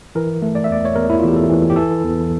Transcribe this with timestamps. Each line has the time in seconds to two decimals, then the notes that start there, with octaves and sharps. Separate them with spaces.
0.15 E3 A#4
0.42 A3
0.55 D5
0.64 E5
0.70 E2 D5
0.85 C#5
0.96 E2 A#4
1.10 E4
1.19 F4
1.23 E2 G4
1.36 A4
1.49 E3
1.70 G4
1.76 E3 A4
2.03 E2